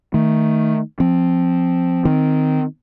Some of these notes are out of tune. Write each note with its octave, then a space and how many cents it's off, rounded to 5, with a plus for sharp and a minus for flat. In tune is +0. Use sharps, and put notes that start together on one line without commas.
D#3 +0 A3 +0
F3 +0 C4 +0
D#3 -5 C4 -15